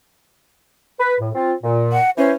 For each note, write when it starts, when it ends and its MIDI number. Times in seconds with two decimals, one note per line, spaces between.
0.99 1.15 71
1.20 1.30 45
1.35 1.53 60
1.35 1.53 65
1.63 1.96 46
1.92 2.10 78
2.18 2.33 52
2.18 2.31 61
2.18 2.33 72